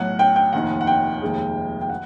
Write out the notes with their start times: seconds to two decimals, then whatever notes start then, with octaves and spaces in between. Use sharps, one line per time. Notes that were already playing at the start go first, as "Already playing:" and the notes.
Already playing: B1 A2 F#3 F#5
0.19 G5
0.36 G5
0.53 F1 D#2 D#3 F#5
0.81 F#5
0.87 G5
1.22 F1 D#2 D#3 G#3
1.81 G5
1.90 F#5